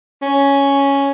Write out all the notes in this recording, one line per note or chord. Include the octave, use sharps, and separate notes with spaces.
C#4